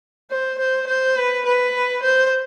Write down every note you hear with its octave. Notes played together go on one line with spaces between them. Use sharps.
C5
C5
C5
B4
B4
C5